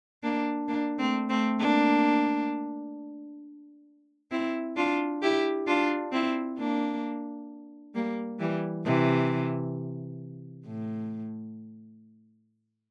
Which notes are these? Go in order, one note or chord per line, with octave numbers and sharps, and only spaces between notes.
A#3 D4
A#3 D4
A3 C4
A3 C4
A#3 D4
C4 E4
D4 F4
E4 G4
D4 F4
C4 E4
A#3 D4
G3 A#3
E3 G3
C3 E3
A2